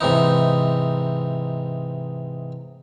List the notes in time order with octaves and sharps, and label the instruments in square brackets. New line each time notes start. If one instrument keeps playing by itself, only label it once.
[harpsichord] G#2 C3 E3 D#4